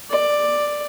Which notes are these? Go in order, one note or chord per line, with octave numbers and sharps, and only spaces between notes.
D5